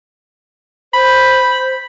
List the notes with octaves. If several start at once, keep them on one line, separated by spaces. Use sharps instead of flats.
C5 B5